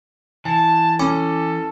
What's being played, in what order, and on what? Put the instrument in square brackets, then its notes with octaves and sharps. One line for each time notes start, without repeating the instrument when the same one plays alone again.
[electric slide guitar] E3 [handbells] G#5 [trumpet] A5
[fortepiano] C#4 [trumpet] A4 [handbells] G#5 B5 D6